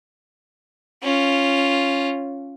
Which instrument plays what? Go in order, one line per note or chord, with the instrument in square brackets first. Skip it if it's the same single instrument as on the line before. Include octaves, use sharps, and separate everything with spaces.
[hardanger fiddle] C#4 F4